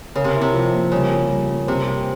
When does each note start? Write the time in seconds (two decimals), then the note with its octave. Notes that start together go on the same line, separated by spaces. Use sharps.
0.15 C#3 A#4
0.24 C3
0.35 E4
0.41 C3
0.54 F3
0.73 A#3
0.92 C#3 G3
1.11 F4
1.30 G3
1.49 A#3
1.67 C3 C5
1.87 G4